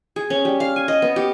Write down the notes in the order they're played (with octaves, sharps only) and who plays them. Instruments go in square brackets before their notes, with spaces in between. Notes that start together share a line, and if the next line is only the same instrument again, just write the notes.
[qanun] G#4
C#4
G3
F5
G#5
D#5
B3
G4